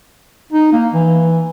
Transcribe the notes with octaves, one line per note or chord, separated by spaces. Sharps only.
D#4
A#3
E3